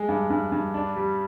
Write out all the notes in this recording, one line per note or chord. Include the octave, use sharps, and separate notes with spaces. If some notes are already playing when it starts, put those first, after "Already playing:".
Already playing: G#3
G2
G2
G2
D4
G3